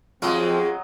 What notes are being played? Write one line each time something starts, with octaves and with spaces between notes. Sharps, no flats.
F2 F3 F#3 G#3 C4 F4 D#5